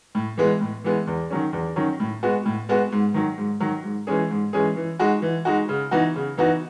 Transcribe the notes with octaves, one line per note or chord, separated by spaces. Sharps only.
A2
E3 G#3 B3
A2
E3 G#3 B3
E2
D#3 F#3 C#4
E2
D#3 F#3 C#4
A2
G#3 B3 F#4
A2
G#3 B3 F#4
G#2
D#3 F#3
G#2
D#3 F#3
G#2
E3 G#3 C#4 G#4
G#2
E3 G#3 C#4 G#4
E3
G#3 D#4 F#4
E3
G#3 D#4 F#4
C#3
E3 B3 D#4 F#4
C#3
E3 B3 D#4 F#4